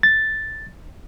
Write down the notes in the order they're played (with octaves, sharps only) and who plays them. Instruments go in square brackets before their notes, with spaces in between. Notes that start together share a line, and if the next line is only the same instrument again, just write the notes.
[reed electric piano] A6